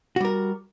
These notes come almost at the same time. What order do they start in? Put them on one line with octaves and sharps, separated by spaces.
F#4 G3 A#4